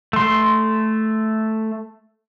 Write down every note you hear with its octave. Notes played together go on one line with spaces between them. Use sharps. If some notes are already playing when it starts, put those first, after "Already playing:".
A3 C6